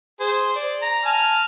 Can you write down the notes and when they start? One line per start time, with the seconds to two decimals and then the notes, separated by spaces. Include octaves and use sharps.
0.20 G#4 C5
0.56 D5
0.82 A#5
1.05 G#5 A5 F6